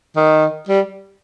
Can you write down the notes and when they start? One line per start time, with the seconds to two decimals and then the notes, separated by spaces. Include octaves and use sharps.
0.16 D#3
0.69 G3